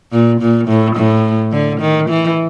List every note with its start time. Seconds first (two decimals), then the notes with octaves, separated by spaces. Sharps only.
0.12 A#2
0.41 A#2
0.68 A2
0.96 A2
1.52 D3
1.81 D#3
2.10 E3